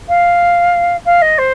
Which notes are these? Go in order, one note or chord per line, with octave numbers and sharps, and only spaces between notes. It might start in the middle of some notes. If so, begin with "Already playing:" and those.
F5
F5
D#5
C5